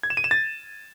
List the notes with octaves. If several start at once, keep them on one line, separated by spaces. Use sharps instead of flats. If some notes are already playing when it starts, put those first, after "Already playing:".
G#6
E7
D#7
E7
A6